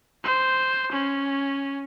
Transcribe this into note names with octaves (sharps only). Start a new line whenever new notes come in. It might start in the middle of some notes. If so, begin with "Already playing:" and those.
C5
C#4